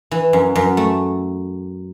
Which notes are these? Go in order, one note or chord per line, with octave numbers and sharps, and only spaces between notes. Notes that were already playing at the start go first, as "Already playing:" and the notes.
E3
F#2
F#2
A3